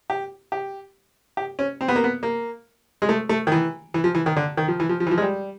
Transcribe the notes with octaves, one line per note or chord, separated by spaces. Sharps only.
G4
G4
G4
C#4
C4
B3
A#3
B3
A#3
G#3
A3
A3
D#3
E3
E3
F3
E3
D#3
D3
D#3
F3
E3
F3
F3
E3
F3
G#3
G3